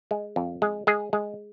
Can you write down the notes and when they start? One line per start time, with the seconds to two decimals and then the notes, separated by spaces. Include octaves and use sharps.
0.11 G#3
0.36 F2
0.62 G#3
0.87 G#3 G#4
1.13 G#3